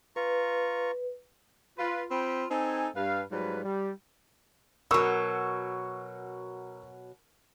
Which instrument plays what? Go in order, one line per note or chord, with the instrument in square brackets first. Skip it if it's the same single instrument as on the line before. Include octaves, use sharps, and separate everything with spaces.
[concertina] F4 A#5 C#6 [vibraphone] B4
[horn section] F4 B4
C4 F4 G5 B5
C4 D#4 A4 G#5
G2 B4 F5
G#2 F#3 G3 F4 B4
G3
[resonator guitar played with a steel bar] B2 F#3 [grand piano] A#4 C#6 E6